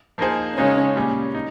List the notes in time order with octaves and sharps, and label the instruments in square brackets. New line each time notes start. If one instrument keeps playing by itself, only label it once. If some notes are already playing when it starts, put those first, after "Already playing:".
[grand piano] F3 A#3 D#4 G#4 C5
[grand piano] C#3 G#3 D#4 [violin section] C#4
[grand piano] A#2 G3 C#4
D#4